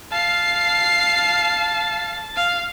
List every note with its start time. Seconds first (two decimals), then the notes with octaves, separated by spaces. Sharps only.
0.12 F5 A5 C7
2.36 F5